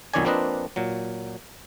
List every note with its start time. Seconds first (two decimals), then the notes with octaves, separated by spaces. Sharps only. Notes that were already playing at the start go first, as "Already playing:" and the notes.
0.14 B1 F2 D#3 C#5 D5 G#5
0.25 F3 A#3 C4 D4 B4 D#5
0.76 A#2 F#3